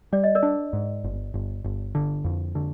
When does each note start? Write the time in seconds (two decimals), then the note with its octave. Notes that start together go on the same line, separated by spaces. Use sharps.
0.13 G3 D5
0.24 D#5
0.35 A#4 D5
0.43 D4
0.73 G#2
1.04 G1
1.34 G1
1.64 G1
1.95 D3
2.25 F2
2.55 D3